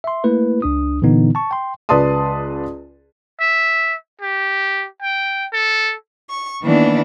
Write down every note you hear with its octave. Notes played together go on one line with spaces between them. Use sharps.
E5 C6
A3 A#3 E4 B4
C#2 D4 D#6
A#2 D3 E3 B3 D#4
A5 C#6
G5 C6
C#2 B4 D5 A5 C6 D#6
E5
G4
G5
A4
C#6
D#3 E3 A#3 B3 D4 E4